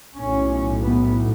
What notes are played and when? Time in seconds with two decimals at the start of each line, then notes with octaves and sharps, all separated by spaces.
0.17 B1 A2 C#4
0.83 B3